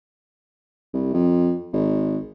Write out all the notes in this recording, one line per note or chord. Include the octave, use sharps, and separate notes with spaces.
C2
F2
G#1